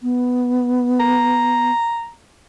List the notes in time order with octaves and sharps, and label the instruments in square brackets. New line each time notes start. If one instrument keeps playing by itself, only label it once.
[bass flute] B3
[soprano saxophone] A#5